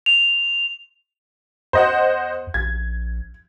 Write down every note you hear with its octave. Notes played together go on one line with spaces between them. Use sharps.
F7
E2 C5 D#5 F#5
A#1 G#6